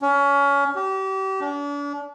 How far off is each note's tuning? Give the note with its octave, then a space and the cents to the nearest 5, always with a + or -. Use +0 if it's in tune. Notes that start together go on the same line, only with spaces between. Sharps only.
C#4 +25
G4 -35
D4 -40